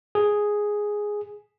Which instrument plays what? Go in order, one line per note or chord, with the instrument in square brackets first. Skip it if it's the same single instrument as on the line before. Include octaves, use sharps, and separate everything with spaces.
[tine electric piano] G#4